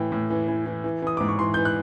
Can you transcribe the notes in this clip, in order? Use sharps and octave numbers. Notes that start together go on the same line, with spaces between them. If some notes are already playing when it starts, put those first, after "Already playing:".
Already playing: A2 E3 G5
A2
E3
E3
E3
E3
E3 D#6
G#2 D6
C#6
E3 C6
E3 G6
F#6